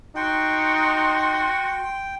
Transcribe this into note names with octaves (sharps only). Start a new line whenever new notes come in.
D#4 F#4 G5 C6